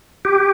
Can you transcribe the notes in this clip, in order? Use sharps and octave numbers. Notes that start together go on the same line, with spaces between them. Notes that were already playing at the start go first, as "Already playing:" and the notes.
G4